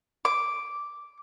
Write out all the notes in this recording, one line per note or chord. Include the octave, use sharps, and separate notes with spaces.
D6